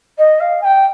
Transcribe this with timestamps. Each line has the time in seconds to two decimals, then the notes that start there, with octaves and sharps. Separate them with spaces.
0.18 D#5
0.39 F5
0.61 G#5
0.64 G5